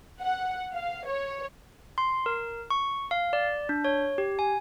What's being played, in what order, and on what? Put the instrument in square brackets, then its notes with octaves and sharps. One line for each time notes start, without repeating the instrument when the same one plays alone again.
[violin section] F#5
F5
C#5
[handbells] C6
A#4
C#6
F5
D5
D4
C#5
G4
G#5